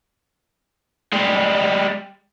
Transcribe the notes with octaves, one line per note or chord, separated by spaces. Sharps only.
G3 G#3